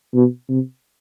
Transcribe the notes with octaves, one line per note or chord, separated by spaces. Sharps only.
B2
C3